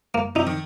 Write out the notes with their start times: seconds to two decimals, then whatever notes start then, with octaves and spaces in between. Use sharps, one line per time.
0.15 A#3
0.35 C3 D#4
0.47 D#3